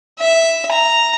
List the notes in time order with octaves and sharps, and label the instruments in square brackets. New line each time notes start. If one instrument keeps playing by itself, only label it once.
[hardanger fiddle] E5
A#5